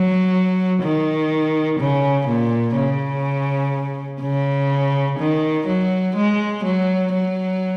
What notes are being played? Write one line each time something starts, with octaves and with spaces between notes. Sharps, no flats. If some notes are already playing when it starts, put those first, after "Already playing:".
Already playing: F#3
D#3
C#3
A#2
C#3
C#3
D#3
F#3
G#3
F#3
F#3